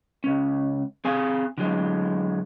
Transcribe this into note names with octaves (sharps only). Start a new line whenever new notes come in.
C#2 C#4
C4 G#4 F5 G#5
D3 F#3 G#3